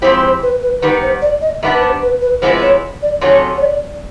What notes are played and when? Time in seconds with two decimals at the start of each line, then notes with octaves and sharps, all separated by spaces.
0.02 F3 G#3 C4 E4 G4 C5
0.22 C5
0.43 B4
0.62 B4
0.82 D#3 G3 B3 B4
1.02 C5
1.22 D5
1.41 D#5
1.62 D#3 G3 B3 D4 E5
1.74 B4
1.82 C5
2.02 B4
2.21 B4
2.42 C3 F3 G#3 B3 E4 C5
2.63 C#5
3.02 D5
3.21 C3 D#3 F#3 A3 C#4 C#5
3.57 C#5
3.62 D5